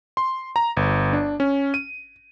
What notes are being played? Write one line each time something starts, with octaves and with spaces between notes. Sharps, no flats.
C6
A#5
G1
D4
C#4
D#7